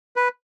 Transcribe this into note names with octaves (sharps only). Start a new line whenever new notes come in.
B4